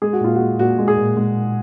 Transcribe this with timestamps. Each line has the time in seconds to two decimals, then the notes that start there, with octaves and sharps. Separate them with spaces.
0.02 G#3 G#4
0.13 F#4
0.21 A#2 F4
0.36 F#4
0.40 G#3
0.59 A#2 F#4
0.79 G#3
0.88 G#4
0.98 A#2
1.17 G#3